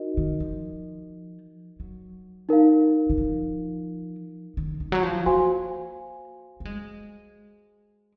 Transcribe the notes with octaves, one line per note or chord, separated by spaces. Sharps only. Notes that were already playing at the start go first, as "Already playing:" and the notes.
Already playing: D#4 F#4 A#4 D#5
D#3
F3
F#3
D#4 A#4 F5
D#3
F3
D#3
D#3
F#3
F3
A#3 F#4 C5 F5 G#5 C6
A#3
G#3